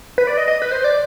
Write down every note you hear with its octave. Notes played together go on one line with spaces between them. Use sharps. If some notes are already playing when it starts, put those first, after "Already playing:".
B4
D5
D#5
D#5
B4
C5
D5